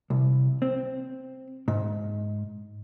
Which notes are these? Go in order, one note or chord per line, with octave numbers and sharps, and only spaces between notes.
C2
C4
G#2